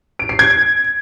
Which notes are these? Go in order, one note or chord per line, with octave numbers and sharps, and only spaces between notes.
D7
C7
G#6